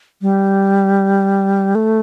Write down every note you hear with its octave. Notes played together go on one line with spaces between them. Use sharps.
G3
A3